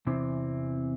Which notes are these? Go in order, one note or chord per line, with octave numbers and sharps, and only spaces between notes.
E2 C3 E3 C4